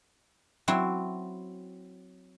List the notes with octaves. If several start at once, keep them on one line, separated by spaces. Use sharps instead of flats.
F#3 C4 E4